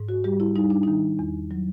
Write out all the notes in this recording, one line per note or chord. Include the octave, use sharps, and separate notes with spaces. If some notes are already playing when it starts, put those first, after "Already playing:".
Already playing: G#2
F#4
G3 G4
E4
G3 D#4
D4
D#3 D#4
E2
F#3